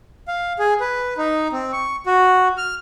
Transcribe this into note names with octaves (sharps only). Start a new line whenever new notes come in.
F5
G#4
B4
D#4
C4
C#6
F#4
F6